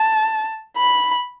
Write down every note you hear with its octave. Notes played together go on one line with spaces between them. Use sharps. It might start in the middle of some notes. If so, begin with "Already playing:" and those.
Already playing: A5
B5